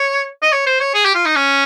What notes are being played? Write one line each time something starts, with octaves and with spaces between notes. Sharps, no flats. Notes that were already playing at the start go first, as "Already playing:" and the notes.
Already playing: C#5
D#5
C#5
C5
C#5
G#4
G4
F4
D#4
C#4